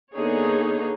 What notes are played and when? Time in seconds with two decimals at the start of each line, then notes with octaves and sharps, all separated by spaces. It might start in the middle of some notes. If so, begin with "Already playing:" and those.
0.15 D3 A#3 B3 D#4 G#4 C#5